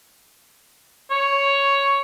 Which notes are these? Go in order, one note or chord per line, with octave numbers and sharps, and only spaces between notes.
C#5